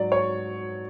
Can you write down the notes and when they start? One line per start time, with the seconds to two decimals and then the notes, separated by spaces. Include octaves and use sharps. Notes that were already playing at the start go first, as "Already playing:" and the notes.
Already playing: G#2 F#3 D5
0.12 C#5